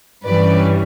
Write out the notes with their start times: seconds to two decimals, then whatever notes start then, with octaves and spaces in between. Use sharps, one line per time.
0.25 G2 E3 G3 C#4 B4 D5